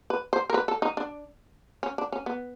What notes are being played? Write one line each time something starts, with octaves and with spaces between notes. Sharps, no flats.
B4
C5
A#4
B4
A4
D#4
D4
C#4
D4
C#4
B3